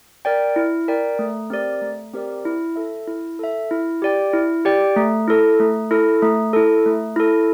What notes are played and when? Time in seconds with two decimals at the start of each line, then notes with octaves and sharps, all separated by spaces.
0.25 A#4 D5 G5
0.56 E4
0.88 A#4 D5 G5
1.19 A3
1.50 C4 G4 A#4 D5
1.81 A3
2.13 C4 G4 A#4 D5
2.45 E4
2.76 A4 E5
3.07 E4
3.39 A4 E5
3.71 E4
4.02 G4 D5 G5
4.33 E4
4.65 G4 D5 G5
4.96 A3
5.28 E4 A4
5.60 A3
5.91 E4 A4
6.22 A3
6.53 E4 A4
6.86 A3
7.16 E4 A4